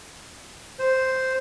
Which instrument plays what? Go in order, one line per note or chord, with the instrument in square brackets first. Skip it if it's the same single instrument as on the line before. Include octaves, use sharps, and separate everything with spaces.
[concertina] C5